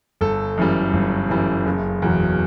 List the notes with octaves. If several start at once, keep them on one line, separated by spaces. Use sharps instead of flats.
G1 A4
F#2 E3 G3
G1
F#2 E3 G3
F#1
E2 B2 F#3